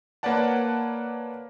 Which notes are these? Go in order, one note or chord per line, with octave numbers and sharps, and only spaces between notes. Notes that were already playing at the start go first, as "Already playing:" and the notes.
A#3 B4 C#5 D5 F#5 A5